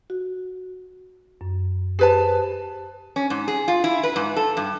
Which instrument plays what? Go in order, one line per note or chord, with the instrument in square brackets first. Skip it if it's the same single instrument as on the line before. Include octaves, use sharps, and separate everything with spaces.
[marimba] F#4
F#2
[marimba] G4 C5 [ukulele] G#4 B4 A5
[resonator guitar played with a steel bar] C#4
G#2
G#4
F4
E4
B4
G#2
A4
G2